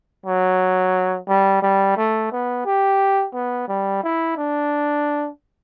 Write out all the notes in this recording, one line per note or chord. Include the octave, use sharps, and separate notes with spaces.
F#3
G3
G3
A3
B3
G4
B3
G3
E4
D4